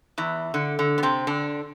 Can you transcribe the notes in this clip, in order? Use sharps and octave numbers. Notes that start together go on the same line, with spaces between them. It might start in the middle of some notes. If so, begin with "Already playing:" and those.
E2 E3
D3
D3
B3
C3 C4
D3 D4